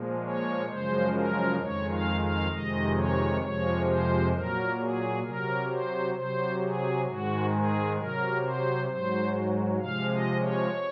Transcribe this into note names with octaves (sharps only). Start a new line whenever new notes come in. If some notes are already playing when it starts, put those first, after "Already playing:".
Already playing: A#2 F3 G#3
C#5
F#2 C#3 F3 G#3 C5
A#4
F2 D#3 G#3 C#5
F5
F5
F2 C3 D#3 G#3 D#5
C#5
F2 C3 F3 G#3 C#5
C5
A#2 F#3 A#4
G#4
C3 F#3 A#4
C5
C3 F#3 C5
G#4
G#2 D#3 G#3 F#4
G#4
C3 F#3 A#4
C5
G#2 F#3 C5
C3 F3 G#3 F5
D#5
C#5